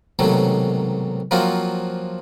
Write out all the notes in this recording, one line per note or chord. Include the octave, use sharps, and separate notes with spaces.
B1 G#2 C3 D#3 F#3 A3
F3 F#3 A#3 C4 F4 F#4